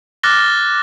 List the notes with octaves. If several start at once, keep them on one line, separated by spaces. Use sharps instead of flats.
D6 F6 F#6 A6 A#6 G7